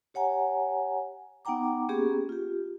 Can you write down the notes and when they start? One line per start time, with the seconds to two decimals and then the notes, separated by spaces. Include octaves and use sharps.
0.14 G4 C#5 F#5 G#5 A#5
1.45 B3 D#4 F#5 G5 A#5 D6
1.89 A#3 B3 C#4 G4 G#4
2.29 F4 G4